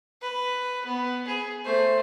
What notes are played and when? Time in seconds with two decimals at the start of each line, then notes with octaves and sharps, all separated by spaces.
0.22 B4
0.85 B3
1.27 G#4
1.65 A3 C5